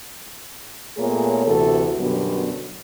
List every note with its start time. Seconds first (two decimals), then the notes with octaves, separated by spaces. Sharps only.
0.97 A#2 A3 B3 G#4 A#4 C#5
1.46 D2 C3 E3 F#4 A4
1.98 F#2 B2 D3 F#3 G3 B3